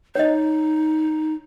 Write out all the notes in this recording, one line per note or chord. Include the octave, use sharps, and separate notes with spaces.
D#4 C#5 D#5